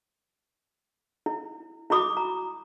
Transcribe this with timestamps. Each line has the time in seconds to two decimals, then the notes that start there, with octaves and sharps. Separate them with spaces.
1.26 E4
1.90 E4 F#4 B5 D6 D#6
2.17 A#5